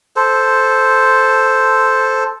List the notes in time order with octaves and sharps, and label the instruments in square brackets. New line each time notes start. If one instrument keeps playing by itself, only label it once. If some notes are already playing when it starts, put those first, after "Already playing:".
[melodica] A4 C5